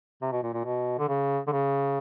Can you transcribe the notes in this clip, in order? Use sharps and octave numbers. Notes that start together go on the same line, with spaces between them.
C3
B2
A#2
A#2
B2
D3
C#3
D3
C#3